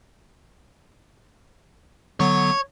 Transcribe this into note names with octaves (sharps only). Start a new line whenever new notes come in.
D3 F#3 B3 C#5